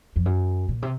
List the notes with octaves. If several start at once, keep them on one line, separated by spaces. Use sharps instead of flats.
F2
F#2
A#2
C3